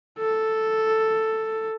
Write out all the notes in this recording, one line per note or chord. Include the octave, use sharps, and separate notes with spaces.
A4